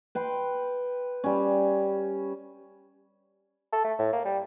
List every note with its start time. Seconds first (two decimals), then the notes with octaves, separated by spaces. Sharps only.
0.15 B4 G5 C6
1.24 G3 C#4
3.72 A4
3.84 A3
3.99 A2
4.13 A#3
4.25 G3